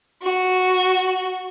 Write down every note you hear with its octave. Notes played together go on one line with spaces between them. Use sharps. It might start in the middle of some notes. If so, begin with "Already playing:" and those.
F#4